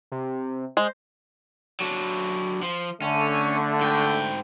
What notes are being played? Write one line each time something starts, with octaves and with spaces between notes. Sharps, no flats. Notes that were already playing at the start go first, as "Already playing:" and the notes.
C3
G#3 C5
F#3 D4
F3
D3 A3 C#4
G#2 G5